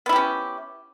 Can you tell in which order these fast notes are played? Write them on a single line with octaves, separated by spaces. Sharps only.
B3 E4 G4 C#4